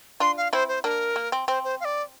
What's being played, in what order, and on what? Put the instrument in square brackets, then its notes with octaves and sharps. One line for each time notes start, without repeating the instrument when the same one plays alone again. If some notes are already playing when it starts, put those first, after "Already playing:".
[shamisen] D4 F4 [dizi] C6
[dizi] F5
[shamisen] C4 E4 [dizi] C5
[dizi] C5
[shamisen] A#3 D4 [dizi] A#4
[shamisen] A#3
C4
[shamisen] C4 [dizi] C5
[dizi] C5
F5
D5